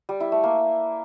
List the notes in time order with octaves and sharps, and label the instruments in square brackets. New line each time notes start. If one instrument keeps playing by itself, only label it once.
[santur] G3
E4
A3
A#3